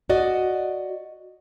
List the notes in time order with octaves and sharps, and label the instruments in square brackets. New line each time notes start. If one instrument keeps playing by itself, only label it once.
[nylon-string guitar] F#4 D5 D#5